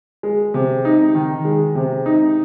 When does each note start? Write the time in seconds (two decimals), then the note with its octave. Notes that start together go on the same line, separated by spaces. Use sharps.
0.23 G#3
0.54 C3
0.85 D#4
1.15 D#3
1.45 G#3
1.75 C3
2.06 D#4